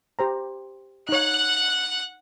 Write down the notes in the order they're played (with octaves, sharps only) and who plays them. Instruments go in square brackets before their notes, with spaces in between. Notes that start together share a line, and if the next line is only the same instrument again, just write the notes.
[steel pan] G4 C5 A#5
[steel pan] D#4 C#5 [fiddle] F#5 F#6